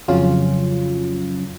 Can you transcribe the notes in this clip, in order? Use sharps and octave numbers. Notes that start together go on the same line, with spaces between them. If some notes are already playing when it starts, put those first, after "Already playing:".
F2 C#3 F#3 C#4 F4